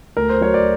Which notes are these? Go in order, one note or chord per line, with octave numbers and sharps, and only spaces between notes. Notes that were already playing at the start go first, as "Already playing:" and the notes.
D2 A#4
C5
F#3 C#5
D5